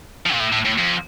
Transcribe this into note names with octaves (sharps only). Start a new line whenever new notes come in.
F3
A#2
A2
A2
A2
F2